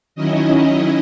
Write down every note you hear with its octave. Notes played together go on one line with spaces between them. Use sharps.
D#3 F#3 C#4 E4 D#5